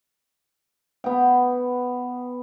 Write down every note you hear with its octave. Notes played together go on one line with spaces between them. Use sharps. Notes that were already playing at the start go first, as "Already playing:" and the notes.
B3 G5